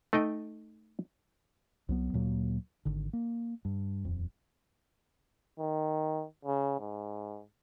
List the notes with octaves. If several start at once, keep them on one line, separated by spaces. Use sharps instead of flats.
A3 D#4 D#5 G5
C2 F#3 B3
D2 A#2 F#3 A#3
G#1 D3
A#3
G2
D#1 F2
D#3
C#3
G#2